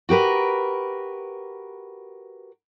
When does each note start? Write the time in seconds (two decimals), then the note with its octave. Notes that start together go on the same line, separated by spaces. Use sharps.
0.09 F#4 G4 A#4 B4